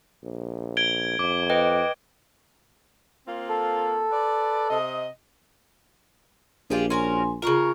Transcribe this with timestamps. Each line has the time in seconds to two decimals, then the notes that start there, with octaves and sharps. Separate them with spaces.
0.24 A#1
0.77 G#6 D7 G7
1.19 F2 D6
1.50 B4 D#5 G5
3.27 A#3 C4 F4
3.49 A4
4.11 B4 D5
4.69 C3 D#5
6.70 A#1 F4 G4 G#4
6.90 C#4 F#4 A#4 G#5 C6
7.42 C#3 F4 A#4 A#5 C#6